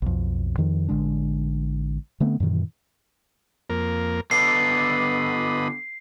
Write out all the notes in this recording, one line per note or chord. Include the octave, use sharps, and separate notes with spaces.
B1 F2
F2 D#3 F3
A1 D3 G#3 D4
D3 A3 B3 C4
F#2 A#2 D#3 E3
F2 A#3 A#4
D3 B3 A4 B4 D#5 C7